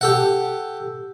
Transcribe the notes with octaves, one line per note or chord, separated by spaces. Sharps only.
G4 A4 F#5